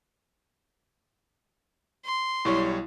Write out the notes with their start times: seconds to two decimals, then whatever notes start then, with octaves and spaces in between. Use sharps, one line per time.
2.05 C6
2.45 B1 G3 E4 C#5 C#6